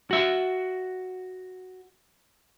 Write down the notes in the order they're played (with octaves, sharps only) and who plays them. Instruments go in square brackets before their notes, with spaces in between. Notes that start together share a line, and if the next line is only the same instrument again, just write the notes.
[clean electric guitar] F#4 E5